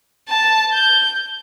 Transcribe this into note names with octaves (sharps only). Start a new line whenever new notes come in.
A5
G6